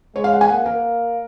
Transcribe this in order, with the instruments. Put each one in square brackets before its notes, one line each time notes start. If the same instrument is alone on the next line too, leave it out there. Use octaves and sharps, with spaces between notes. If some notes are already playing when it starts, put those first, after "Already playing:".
[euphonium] G#3 [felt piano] C#5
[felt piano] F5
F#5
G#5
[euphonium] A#3 [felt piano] F#5
[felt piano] A#4